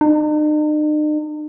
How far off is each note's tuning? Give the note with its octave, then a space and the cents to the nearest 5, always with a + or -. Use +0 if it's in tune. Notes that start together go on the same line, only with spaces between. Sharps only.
D#4 -45